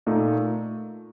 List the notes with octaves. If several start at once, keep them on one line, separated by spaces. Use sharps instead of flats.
A#2 A3 D#4